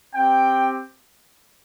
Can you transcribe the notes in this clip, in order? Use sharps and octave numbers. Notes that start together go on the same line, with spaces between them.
C4 G4 G5